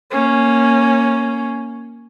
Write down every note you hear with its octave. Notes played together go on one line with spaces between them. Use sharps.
A#3 C#4